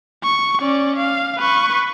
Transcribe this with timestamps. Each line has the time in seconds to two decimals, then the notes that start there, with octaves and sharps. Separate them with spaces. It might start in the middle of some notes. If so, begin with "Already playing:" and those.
0.24 C#6
0.61 C#4 D5
0.97 F5
1.38 B4 C#6